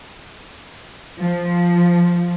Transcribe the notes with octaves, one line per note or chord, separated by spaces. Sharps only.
F3